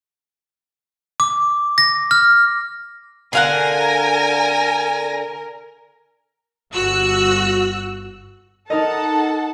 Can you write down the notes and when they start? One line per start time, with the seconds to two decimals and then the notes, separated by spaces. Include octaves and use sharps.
1.20 D6
1.78 A#6
2.11 F6
3.33 D3 A#4 F5 F#5 G#5 A#6
6.74 G1 F#4 E6 F#6
8.70 D#4 A4 A#4 D#5 F#5 A5